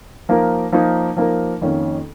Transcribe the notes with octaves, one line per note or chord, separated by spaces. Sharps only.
F3 A#3 D#4 A#4
F3 A#3 D#4 A#4
F3 A#3 D#4 A#4
F2 D#3 A#3 C#4